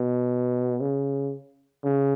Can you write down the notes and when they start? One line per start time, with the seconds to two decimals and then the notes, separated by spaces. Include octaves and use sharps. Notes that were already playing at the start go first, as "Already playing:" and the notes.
Already playing: B2
0.81 C#3
1.84 C#3